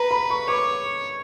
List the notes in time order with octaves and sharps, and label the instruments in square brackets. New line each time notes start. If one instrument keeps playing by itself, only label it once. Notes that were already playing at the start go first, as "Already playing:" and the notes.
Already playing: [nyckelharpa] B4 [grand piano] A#5
[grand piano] B5
C#6
[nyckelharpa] C#5 [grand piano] D6